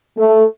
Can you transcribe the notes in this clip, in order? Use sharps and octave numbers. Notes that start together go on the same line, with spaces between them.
A3